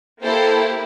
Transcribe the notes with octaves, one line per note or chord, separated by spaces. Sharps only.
A#3 E4 G4 A4 C5